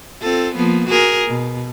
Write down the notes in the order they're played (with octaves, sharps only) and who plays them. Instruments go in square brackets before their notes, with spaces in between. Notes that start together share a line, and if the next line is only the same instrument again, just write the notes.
[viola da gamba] C4 F4 A4
F3 A#3 B3
F#4 G#4 A#4
B2